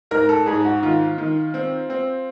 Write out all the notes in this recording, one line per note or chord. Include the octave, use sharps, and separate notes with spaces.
G#2 A#4
A4
G#2 G#4
F#4
D#3 F4
D#3
C4
C4